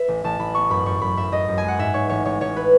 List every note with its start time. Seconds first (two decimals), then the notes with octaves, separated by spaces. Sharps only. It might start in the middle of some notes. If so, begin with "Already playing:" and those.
Already playing: B4 E5
0.08 A1
0.24 A1 A5
0.39 A1 B5
0.54 B3 C#6
0.70 F#2 B5
0.86 F#2 C#6
1.01 F#2 B5
1.17 F#2 E5
1.32 F#2 D#5
1.48 F#2
1.58 G#5
1.63 G#3 F#5
1.79 G#2 E5
1.94 G#2 C#5
2.09 A1 C#5
2.25 A1 C#5
2.41 A1 C#5
2.56 B4